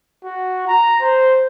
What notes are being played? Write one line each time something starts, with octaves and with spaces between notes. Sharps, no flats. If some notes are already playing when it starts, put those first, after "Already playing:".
F#4
A#5
C5